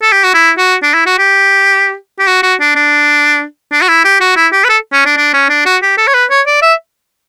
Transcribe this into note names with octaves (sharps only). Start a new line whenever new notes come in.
A4
G4
F#4
E4
F#4
D4
E4
F#4
G4
G4
F#4
F#4
D4
D4
D4
F#4
E4
G4
F#4
E4
G4
B4
A4
C#4
D4
D4
C#4
D4
F#4
G4
A4
C#5
B4
C#5
D5
E5